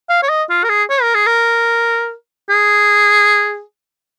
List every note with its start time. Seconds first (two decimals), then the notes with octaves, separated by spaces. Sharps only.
0.09 F5
0.22 C#5
0.29 D#5
0.49 F4
0.64 A#4
0.69 G#4
0.90 C#5
1.02 A#4
1.14 G#4
1.26 A#4
2.49 G#4